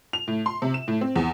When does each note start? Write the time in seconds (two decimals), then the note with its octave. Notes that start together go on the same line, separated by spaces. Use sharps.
0.13 F7
0.28 A2
0.46 C6
0.62 C3
0.74 E7
0.88 A2
1.01 C4
1.16 E2